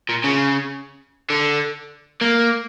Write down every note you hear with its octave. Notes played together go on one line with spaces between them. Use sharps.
A#2
C#3
D3
A#3